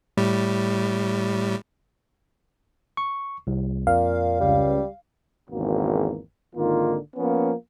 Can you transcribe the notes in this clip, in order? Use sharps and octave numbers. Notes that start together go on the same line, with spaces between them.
A2 G3
C#6
C2
F2 A#2 F5
C#2 G3
G#1 E2 C#3 A#3 F#4
G#1 D3 D#3 A#3 F4
F3 A#3 B3 C#4